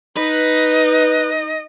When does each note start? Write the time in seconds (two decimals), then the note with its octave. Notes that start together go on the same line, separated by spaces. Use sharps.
0.17 D#4 B4 D#5